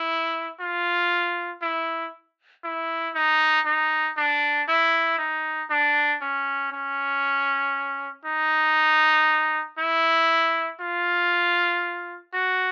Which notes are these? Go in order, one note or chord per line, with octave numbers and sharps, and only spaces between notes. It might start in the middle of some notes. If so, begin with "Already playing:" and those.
Already playing: E4
F4
E4
E4
D#4
D#4
D4
E4
D#4
D4
C#4
C#4
D#4
E4
F4
F#4